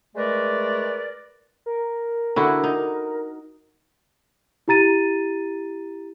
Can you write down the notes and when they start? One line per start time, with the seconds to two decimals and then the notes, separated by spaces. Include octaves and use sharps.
0.16 G#3 A3 A#4 B4 D5
1.66 A#4
2.36 D3 E4 F#4
2.64 D#4
4.68 E4 G4 A#5 A6 D#7